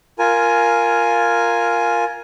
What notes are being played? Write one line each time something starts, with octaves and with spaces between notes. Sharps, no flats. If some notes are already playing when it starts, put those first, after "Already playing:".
F4 A#4 G#5